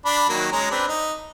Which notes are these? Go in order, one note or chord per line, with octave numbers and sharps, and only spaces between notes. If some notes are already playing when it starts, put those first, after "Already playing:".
D4 B5
D#3 F#3 A#3
G#3 C#4 A#5
C4 D4 B4
D#4